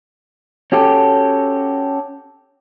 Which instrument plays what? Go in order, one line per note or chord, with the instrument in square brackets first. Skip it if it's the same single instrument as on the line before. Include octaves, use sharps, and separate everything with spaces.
[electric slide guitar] C#4 F#4 G4 A4